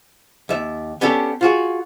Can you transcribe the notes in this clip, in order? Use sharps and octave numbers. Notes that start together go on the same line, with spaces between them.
D#2 E5
B3 C#4 D4 G4 A4
F4 F#4 G#4